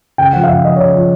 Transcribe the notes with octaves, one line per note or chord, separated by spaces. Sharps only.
C#3 G5
F3 F#5
F5
C#3 E5
F3 D#5
C#5
C#3 D5
F3